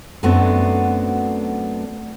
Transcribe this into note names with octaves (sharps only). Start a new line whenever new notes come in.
F#2 F#3 A3 B3 C4 D4